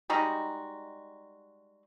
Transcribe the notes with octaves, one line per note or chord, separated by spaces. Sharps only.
G3 G#3 D#4 F#4